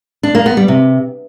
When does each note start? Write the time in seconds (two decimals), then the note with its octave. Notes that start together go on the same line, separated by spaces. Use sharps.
0.23 D4
0.35 A#3
0.46 B3
0.57 G3
0.68 C3